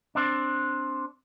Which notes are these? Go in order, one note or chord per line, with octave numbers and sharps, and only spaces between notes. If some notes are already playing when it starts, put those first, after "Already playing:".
C4 D4